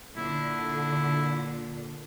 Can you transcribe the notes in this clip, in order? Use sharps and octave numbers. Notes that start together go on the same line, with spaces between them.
A#2 D3 E4